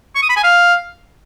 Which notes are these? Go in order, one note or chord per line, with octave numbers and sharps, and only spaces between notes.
C#6
D#6
B5
G#5
F5